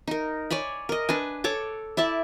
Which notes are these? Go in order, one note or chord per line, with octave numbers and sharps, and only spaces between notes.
D#4 A#4
C#5 D5 G#5 B5
A#4 D#5
D4 B4 G#5
A4 C#5 D6
E4 D5 E5 A5